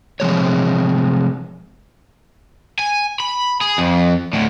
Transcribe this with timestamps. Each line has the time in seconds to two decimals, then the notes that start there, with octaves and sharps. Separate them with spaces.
0.20 C3 F3 G#3 C#5
2.79 G#5
3.20 B5
3.61 G#4
3.78 F2
4.33 D2 A2